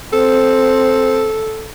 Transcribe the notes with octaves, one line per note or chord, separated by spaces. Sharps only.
C4 A4